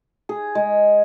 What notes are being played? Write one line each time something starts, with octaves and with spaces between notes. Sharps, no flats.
G#4
G#3